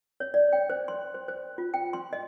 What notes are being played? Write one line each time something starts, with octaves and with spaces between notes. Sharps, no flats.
C#5
D5
G5
C5
C6
C5
C5
F4
G5
C6
D#5